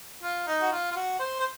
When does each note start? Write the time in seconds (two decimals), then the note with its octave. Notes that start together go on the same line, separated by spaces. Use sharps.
0.23 F4
0.47 D#4
0.62 F#4
0.72 F4
0.91 F4
0.96 F#4
1.19 C5
1.40 C5